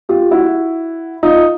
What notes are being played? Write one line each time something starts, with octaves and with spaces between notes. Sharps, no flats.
F4 G4
E4 F#4
D#4 F4